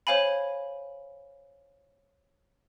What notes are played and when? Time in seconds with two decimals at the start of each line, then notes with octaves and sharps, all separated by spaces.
0.07 C5 C#5 F5 G#5 B5